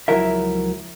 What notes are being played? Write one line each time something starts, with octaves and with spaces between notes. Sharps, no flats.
C#2 F3 F#3 E4 A#4 E5